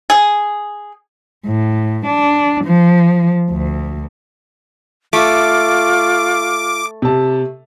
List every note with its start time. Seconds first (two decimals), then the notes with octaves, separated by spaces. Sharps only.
0.10 G#4
1.46 A2
2.06 D4
2.65 F3
3.51 D2
5.13 A3 F4 D6
7.02 C3 A5